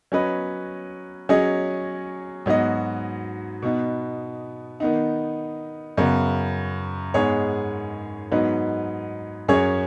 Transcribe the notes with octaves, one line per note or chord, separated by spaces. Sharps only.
F#3 C#4 B4 D#5
F#3 C#4 G#4 D#5
G#2 F#3 B3 F#4 D#5
B2 B3 D#4
D#3 B3 D#4
F#2 C#3 B3
G#2 G#3 B3 G#4 C#5
G#2 F#3 B3 D#4 B4
F#2 F#3 C#4 G#4 C#5